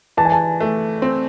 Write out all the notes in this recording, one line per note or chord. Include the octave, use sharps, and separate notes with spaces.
E3 A5
G#5
A5
A3
C4